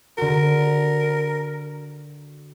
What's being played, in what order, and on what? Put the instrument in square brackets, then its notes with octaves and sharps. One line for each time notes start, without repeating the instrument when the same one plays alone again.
[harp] D3 F#4 [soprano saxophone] A#4